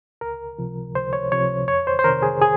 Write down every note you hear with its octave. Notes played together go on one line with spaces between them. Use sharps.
C#2 A#4
C3 F3
C#2 C5
C#5
C3 F3 C#5
F2 C#5
C5
C5
C3 D#3 A#4
G#4
G#4